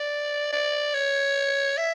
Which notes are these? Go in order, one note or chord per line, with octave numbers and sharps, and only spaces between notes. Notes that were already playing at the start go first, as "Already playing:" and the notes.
Already playing: D5
D5
C#5
E5